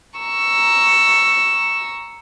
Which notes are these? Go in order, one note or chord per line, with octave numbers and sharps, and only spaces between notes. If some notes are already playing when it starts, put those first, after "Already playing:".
A#5 C#6 E6